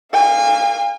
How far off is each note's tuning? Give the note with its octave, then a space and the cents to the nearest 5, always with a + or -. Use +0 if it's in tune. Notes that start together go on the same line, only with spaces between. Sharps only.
F5 +0 G#5 -40